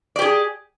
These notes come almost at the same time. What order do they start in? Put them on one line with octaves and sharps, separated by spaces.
D5 G4 G#4